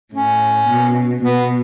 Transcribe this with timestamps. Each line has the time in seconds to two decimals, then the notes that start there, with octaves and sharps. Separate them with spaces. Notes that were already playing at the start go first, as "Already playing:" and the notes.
0.14 A2 C#4
0.68 B2
1.22 B2 B3